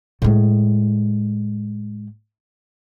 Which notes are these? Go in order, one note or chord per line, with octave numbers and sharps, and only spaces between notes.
A2 G#3